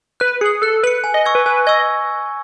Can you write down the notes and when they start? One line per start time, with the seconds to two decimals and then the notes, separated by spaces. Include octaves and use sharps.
0.20 B4 F#6
0.41 G#4 C#7 F#7
0.62 A4 F#6
0.83 B4 C#7 F#7
1.04 G#5
1.14 D#5
1.25 C#6 E6 G#6
1.35 B4
1.46 B4 G#5
1.67 D#5 C#6 E6 G#6